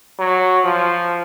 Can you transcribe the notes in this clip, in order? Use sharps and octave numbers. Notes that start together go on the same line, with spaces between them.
F#3
F3